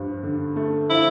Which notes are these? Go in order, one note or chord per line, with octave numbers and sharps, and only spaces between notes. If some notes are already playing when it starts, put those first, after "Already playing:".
Already playing: G2 F3
D3
A3
F3 E4